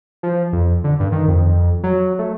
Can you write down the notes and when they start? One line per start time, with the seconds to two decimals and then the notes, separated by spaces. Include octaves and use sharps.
0.23 F3
0.53 F2
0.84 D3
1.00 G2
1.12 D#3
1.28 F2
1.84 F#3
2.19 A3